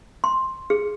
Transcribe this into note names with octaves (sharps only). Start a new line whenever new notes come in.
C6
G#4